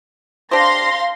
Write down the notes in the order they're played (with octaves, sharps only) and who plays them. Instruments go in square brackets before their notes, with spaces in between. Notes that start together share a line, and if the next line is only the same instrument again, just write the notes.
[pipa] D4 G4 C5 [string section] F5 C6 A#6